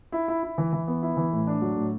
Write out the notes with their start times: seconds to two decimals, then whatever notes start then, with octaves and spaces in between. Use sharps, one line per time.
0.12 E4
0.28 E4
0.43 E4
0.58 E3
0.73 E3
0.88 B3
1.02 E4
1.17 E3
1.33 A2
1.47 D4
1.61 F#3
1.77 A2